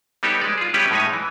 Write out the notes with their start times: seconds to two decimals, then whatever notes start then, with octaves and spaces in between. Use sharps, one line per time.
0.23 G3 B3 D#4 G4 A4 C#5
0.41 G#3 D5
0.58 F4 G#4
0.74 G3 B3 C#4 E4 G4 B4
0.91 A2 G#3 D#4 C#5 G#5
1.13 E3